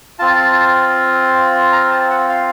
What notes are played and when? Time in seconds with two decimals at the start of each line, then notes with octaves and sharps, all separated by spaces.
0.19 C4 F4 A5
1.72 A#5
1.91 A5
2.10 F#5
2.29 F5